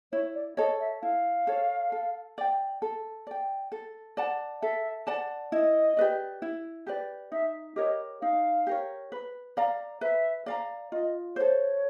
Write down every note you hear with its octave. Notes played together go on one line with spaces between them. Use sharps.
E4 C#5
D5
A4 C#5 D#5
E5
E4 F5
A4 C#5
A4
D5 G5
A4
D5 G5
A4
D5 F#5 A5
A4 E5
D5 F#5 A5
E4 D#5
G4 B4 D5
E4
G4 B4 D5
D#4 E5
G4 A#4 C#5 D#5
D#4 F5
G4 A#4 C#5
B4
D5 F5 A#5
B4 E5
D5 F5 A#5
F4 D#5
A4 C5 C#5